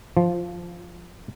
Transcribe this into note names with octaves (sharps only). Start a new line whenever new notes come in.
F3